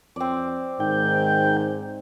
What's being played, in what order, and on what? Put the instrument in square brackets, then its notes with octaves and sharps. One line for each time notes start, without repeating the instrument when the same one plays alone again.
[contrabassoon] F2 [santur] C4 D5
[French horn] G#2 [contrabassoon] D#3 [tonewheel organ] G5